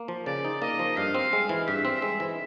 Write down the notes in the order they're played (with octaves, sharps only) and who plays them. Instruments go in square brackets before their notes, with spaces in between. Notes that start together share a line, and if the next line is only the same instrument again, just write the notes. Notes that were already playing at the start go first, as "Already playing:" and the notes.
Already playing: [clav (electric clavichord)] A#3
F3
[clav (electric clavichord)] C#3 [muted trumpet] D5
[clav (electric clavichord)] D#4
[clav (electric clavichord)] A#3 [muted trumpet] D#5
[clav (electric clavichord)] F3
[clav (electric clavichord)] G2 [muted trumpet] F5
[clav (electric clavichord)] C4
G#3
E3
[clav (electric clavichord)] G2 [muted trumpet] E5
[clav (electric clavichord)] C4
G#3
E3